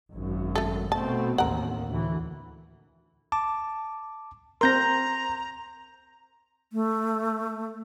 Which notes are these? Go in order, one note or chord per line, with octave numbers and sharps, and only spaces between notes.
G#1 F#2
A3 A4
B2 A3 C4 A5
A1 D#2 A#4 F#5
D2 A2 E3
A5 D6
C4 A#4 A#5 C6 G6 A#6
A3